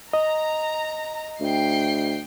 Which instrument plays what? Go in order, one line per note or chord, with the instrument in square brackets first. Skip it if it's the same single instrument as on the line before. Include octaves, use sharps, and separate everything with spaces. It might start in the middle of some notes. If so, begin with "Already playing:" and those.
[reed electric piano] D#5 [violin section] A#5
[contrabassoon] D2 [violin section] G5 C7